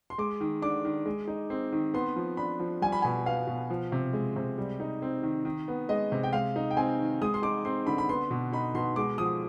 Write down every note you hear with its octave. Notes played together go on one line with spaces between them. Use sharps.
C6
G#3 D6
D#3
D4 D6
D#3
G#3
D#4
C4
D#3
B3 C6
F3
D4 B5
F3
G3 G#5
B5
B2 G#5
B3 F5
B2
F3
C3
G#3
C3
G3
D#4
C4
D#3
D#3
B3
G#3 D#5
C3
G5
G#3 F5
D#4
G5
C4 G#5
D#3
G#3 D#6
C6
D#4 D6
C4 C6
D3 B5
B5
B3 C6
B2
D#4 B5
B2 C6
G#3 D6
F3 D#6